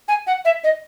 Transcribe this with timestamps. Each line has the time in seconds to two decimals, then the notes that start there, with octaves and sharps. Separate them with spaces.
0.08 G#5
0.27 F#5
0.45 E5
0.64 D#5